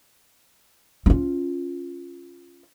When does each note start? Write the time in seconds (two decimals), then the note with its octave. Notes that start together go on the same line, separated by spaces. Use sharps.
1.06 C#4 F4